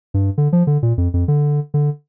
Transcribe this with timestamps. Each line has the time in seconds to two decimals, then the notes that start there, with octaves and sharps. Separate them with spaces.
0.14 G2
0.38 D3
0.53 F3
0.67 D3
0.83 A#2
0.98 F2
1.14 F2
1.28 D3
1.74 D3